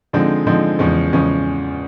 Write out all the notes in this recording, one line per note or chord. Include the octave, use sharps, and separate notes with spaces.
D3 F3 G#3 C4 D#4
D3 F3 G#3 C4 D#4
E2 C#3 F3 G#3 C#4
E2 C#3 F3 G#3 C#4